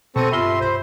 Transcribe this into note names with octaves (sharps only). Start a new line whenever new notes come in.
B2 C4 A4 C#6 A#6 D#7
G2 F4 E5 C6
C2 C5 B5